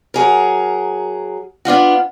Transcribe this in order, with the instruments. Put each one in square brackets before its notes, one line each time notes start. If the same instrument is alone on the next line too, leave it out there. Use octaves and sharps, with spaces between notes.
[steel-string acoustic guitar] F#3 G#4 A#4
B3 D4 F4 F#4